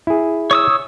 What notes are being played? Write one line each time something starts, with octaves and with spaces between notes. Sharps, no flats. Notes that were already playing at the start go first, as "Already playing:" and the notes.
E4 G#4
C#5 D#6 E6